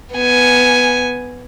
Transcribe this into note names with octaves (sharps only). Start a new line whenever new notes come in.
B3 G#5